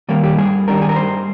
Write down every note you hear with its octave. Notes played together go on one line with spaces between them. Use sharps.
D#3 G3 A#3
G4
G2 G#4
D#3 G3 D4 A#4
G#4
A#4
G2 C5